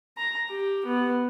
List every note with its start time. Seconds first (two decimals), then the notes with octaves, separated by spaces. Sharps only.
0.17 A#5
0.50 G4
0.85 B3